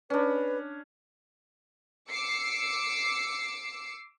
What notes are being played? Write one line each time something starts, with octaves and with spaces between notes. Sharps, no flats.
C#4 D4 B4
D6 E6 C7 C#7